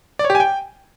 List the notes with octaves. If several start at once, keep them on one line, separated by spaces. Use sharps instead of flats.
D5
C#5
G4
G#5
G5